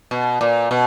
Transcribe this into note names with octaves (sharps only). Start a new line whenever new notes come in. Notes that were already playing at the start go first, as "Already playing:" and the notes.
B2
A#2
B2